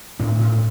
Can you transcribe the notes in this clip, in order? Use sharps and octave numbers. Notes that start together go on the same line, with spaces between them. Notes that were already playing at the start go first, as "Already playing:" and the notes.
A2 D4
A2